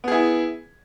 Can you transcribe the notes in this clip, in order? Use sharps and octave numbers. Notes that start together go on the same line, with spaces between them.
B3 E4 G#4